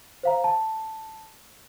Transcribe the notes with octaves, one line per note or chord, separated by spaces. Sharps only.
C5 F5 A#5
A5